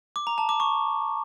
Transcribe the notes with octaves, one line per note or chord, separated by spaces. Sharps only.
D6
A#5
A5
D6
C#6